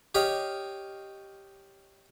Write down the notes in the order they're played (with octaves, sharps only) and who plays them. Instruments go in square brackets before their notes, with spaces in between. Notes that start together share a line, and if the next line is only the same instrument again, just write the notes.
[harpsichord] G4 C#5 D#5 F5